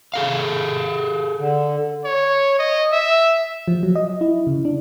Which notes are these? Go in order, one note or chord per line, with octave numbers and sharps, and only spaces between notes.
G#4 A4 F5
D3
C#5
D#5
E5
F3
F#3
D#5
E4
C#3
D4